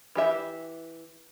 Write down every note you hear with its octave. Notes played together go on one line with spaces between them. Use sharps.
E3 G4 E5